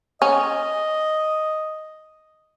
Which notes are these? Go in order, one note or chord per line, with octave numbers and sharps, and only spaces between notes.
C#4 D#5